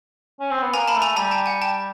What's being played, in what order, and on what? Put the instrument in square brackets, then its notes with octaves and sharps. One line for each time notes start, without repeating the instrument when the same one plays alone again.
[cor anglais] C#4
C4
B3
[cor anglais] A#3 [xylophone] G#5 A#5
[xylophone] A5 B5
[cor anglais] A3
[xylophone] G#5 A#5
[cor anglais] G3 [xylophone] G#5 A#5
[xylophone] G5 A5
F#5 G#5
G5 A5